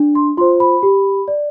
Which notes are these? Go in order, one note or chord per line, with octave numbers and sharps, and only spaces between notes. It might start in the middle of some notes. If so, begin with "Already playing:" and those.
Already playing: D4
C6
F4 C5 C6
B5
G4
D5